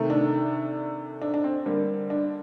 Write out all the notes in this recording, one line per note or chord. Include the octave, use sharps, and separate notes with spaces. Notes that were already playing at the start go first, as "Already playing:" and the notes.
Already playing: C3 D#3 A3
D4
D4
D4
C4
D3 G3 A#3
D4